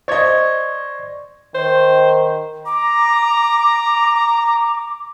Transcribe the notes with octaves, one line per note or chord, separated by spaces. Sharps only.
C5 D5 D#5 C#6 G#6
D#3 C5
A#5 D6